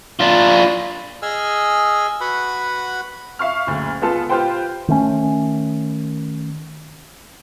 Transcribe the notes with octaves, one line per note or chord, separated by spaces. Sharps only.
D4 F4
G#4 D#5 G#5 E6 F6
F#4 B4 F#5 B5
E5 F5 C#6 F6
F#1 D2
G#3 B3 F4 A4
F4 G4 B4 C5 G5
D#3 A3 C#4